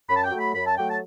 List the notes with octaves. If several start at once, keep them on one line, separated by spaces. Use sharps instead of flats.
F#2 B5
A5
G5
F#3 A3
B5
F#2 B5
A5
F#3 A3 G5
A5